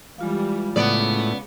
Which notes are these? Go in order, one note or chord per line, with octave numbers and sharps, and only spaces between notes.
E3 G3 G#3 F4 F5
A2 C#3 B3 D5